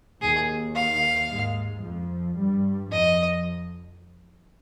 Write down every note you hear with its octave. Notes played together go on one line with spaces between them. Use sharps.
D#2 D#3 G#4
F5
G#2 G#3
F2 F3
G2 G3
F2 F3 D#5